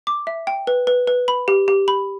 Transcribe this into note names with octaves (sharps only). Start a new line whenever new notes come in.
D6
E5
G5
B4
B4
B4
B5
G4
G4
B5